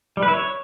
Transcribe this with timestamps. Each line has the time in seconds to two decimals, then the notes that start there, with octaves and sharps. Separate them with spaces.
0.17 G3
0.23 B4
0.28 E4
0.33 C#5